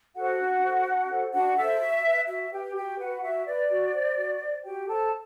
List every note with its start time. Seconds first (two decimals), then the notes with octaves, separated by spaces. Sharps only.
0.16 F#4 A4 C5 F#5
0.39 D4
0.62 A4 C5
0.86 D4
1.10 A4 C5
1.33 D4 F#4 F#5
1.57 A4 C5 E5
1.81 F#4
2.05 B4
2.28 F#4 E5
2.52 G4 B4 G5
2.76 F#4 G4 G5
2.99 F#4 B4 F#5
3.23 F#4 E5
3.47 B4 D5
3.70 F#4
3.93 C5
4.17 F#4
4.41 C5
4.64 F#4 G4 G5
4.88 A4 C5 A5